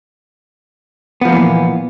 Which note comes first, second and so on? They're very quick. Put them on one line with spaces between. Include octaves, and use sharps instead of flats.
B3 F3 A#3 E3 A#2